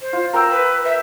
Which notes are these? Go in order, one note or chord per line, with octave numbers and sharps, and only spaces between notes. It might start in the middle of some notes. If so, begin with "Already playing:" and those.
C5
F4
A#4 G5 A#5 E6
B4
E5